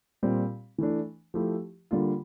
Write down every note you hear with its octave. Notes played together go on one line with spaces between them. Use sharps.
A#2 G3 C4 F4
E3 A3 D4
F3 A3 E4 G4
D3 G3 A#3 F4